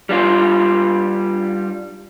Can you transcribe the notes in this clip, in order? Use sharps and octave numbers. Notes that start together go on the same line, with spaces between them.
G3 D4 F4